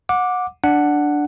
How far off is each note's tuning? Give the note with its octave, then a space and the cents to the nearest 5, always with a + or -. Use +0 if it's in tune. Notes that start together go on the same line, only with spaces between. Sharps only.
F#5 -25 D6 +0
D4 +0 F#5 +0